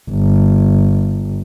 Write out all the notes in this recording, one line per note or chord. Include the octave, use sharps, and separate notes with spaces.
G1